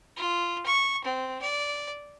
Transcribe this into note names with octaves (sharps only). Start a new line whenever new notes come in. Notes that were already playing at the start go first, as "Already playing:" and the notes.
F4
C#6
C4
D5